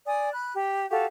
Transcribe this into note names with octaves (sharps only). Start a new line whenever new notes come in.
D5 G#5 D#6
B5 F#6
G4
F#4 G4 A4 F5